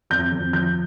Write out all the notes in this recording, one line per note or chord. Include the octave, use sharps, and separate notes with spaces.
F2 G6
F2
F3 G6